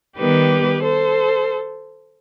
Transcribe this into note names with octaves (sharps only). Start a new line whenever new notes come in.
D#3 G3 B3 G4 B4
A4 C5